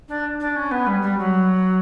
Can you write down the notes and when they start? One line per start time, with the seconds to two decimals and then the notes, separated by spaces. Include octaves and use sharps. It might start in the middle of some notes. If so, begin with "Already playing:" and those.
0.08 D4
0.40 D4
0.55 C#4
0.71 B3
0.86 G3
1.02 G3
1.17 F#3